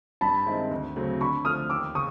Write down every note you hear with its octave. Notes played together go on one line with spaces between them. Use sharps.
G2 A5 B5
D#3 G#3 C4 E4
D2
C#3 F#3 A3 C4
D3 B5 C#6
F3 A3 D#6 F6
D#2 D6 E6
C#3 C#6 D#6